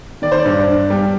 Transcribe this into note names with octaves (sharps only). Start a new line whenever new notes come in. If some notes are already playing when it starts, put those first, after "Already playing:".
D#3 D5
C5
D5
G2
G2
G3